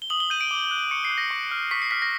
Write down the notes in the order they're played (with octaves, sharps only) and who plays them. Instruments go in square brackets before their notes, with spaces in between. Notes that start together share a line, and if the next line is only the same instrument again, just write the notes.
[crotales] G7
D#6 F#7
G7
G6 D#7
D7
D6
F#6
C#6 C#7
C7
F#6
A#6
C#6
F6
C#6 B6
C7
F6 B6
A#6